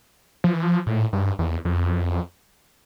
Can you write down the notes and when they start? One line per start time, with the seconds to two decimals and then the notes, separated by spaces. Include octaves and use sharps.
0.44 F3
0.53 E3
0.63 F3
0.87 A2
1.13 G2
1.39 E2
1.65 F2